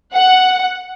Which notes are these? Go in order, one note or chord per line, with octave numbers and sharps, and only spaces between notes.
F#5